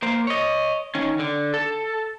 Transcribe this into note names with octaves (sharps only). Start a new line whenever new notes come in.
A#3 C5
C#5 D#5
D#3 C#4
D3
A4